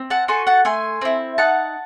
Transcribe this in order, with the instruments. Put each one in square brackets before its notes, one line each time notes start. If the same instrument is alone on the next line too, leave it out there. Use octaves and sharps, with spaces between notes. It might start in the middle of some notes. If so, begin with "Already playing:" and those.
Already playing: [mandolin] C4
F#5 A5
F#4 A4 G#5 C6
F#5 A5
A3 G#5 C6
C4 E4
D#4 F#5 A5